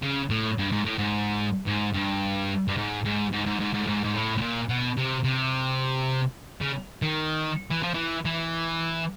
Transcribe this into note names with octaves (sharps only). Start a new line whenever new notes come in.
C#3
A2
G2
G#2
A2
G#2
G#2
G2
G2
G#2
G#2
G#2
G#2
G#2
G#2
A2
G#2
G#2
A2
A2
A#2
B2
C3
C3
C#3
D#3
E3
F3
E3
E3